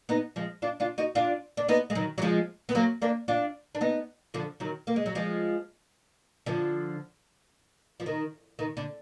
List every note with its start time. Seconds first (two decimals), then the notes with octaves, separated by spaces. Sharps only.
0.09 B3 D#4
0.36 F3 G#3
0.62 D4 F4
0.80 D4 F4
0.98 D#4 F#4
1.15 D4 F4
1.57 D4
1.69 B3 D#4
1.90 G#3
1.95 D#3 F#3
2.18 F#3
2.22 F3 G#3
2.69 B3
2.75 F#3 A#3
3.02 A#3 D4
3.28 D4 F4
3.75 D4
3.81 B3 D#4
4.34 D3 F3
4.60 D#3 F#3
4.87 A#3
4.96 G#3
5.06 F#3
5.15 F3 G#3
6.46 D3 F3
8.00 F3
8.06 D#3
8.59 D#3
8.77 D3